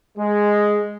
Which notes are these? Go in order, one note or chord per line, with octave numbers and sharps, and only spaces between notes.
G#3